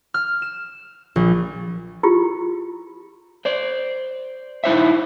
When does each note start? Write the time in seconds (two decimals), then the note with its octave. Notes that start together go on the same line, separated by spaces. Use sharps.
0.14 F6
0.42 E7
1.16 A#1
2.03 E4 F4 G4
3.45 C5 D5
4.64 D#4 E4 C5 E5